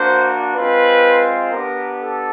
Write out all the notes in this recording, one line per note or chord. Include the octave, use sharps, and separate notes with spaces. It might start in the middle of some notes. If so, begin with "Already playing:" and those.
Already playing: A#3 D4 F#4 C5
G#3 C4 F4 B4
B3 D4 G4 A#4
A4